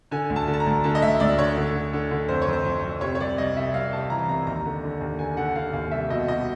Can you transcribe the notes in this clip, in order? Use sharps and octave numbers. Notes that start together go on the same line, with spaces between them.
D3 G#5
D2
A5
D3
A5
A#5
D2
D3 A5
D#5
D2 E5
D2 D5
D3 C#5
D3
D3
D3
D3
F2 C5
C#5
F2
C5
F2
F2
C3 C#5
C#5
C2 D5
C2 D#5
C3 E5
C2 F5
C3 A5
E3 A#5
C2 A#5
D#2 A#5
D3
D3
D#2
D3 G#5
D3 F#5
D3 F5
D#2 F5
C2 E5
B2 D#5
B2 D#5